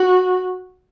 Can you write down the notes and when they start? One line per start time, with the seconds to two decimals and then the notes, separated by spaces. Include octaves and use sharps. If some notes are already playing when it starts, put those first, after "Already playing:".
Already playing: F#4